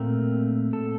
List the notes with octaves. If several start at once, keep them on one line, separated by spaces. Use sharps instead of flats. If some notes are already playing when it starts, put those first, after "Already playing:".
Already playing: A#2 A3 C4 A#4
A4